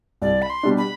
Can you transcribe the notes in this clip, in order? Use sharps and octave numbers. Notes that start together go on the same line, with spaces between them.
C2 D5
B5
C6
B2 G3 D4
B5